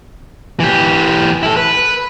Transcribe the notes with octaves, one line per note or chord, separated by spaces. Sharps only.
E3 G4
E4 A4
B4